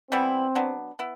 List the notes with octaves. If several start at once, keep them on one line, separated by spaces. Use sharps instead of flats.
E3 G3 B3 C4 E4
F#3 B3 D4
B3 E4